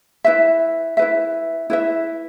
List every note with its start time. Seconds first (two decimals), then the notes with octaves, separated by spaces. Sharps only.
0.24 E4 B4 E5
0.97 E4 B4 E5
1.70 E4 B4 E5